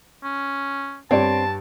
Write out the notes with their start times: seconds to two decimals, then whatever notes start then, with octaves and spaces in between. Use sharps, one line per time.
0.24 C#4
1.11 G2 C4 C#5 D5 A5